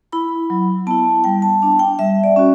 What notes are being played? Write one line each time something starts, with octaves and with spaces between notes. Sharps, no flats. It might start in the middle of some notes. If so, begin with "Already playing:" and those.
E4 B5
F#3
B3 E4 A5
G3 G5
A5
B3 D4 A5
G5
G3 E5
D5
C#4 F#4